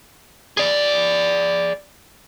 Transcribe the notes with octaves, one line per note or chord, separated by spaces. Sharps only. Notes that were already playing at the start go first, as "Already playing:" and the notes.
G#4 D5